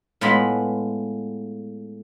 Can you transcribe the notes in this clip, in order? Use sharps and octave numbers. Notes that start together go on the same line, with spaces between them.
A2 G#3 B3 F4 B5